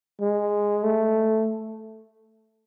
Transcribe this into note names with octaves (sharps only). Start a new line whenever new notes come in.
G#3
A3